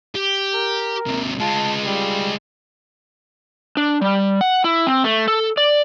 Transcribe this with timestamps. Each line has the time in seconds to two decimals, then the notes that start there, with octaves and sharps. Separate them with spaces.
0.15 G4
0.54 A#4
1.07 D#2 C3
1.40 G#3 F4 A5
1.85 G3
3.77 D4
4.02 G3
4.41 F#5
4.64 E4
4.87 C4
5.04 A3
5.28 A4
5.57 D5